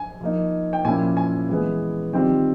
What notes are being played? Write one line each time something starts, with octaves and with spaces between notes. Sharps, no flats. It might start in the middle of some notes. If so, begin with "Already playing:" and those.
Already playing: G#5
F3 A#3 D#4
G5
A#2 F3 A#3 C#4 E4 G#5
G#5
E3 G#3 B3
D#3 G3 C4 F4 G5